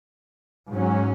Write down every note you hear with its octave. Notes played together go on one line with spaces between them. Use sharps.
G#2 F#3 C#4